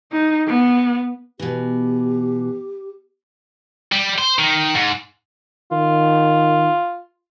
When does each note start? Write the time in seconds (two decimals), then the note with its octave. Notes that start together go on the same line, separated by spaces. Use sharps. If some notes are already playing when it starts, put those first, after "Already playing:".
0.12 D#4
0.47 B3
1.39 B2 E3 G4
3.92 G3
4.18 C5
4.39 D#3
4.75 G#2
5.72 D#3 F4